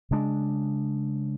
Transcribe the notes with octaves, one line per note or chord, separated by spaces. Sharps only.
C#3 G#3 D4